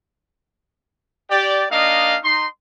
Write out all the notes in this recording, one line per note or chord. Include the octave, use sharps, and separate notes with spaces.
G4 D5
A#3 D4 D#4 D#5 F5
D#4 C6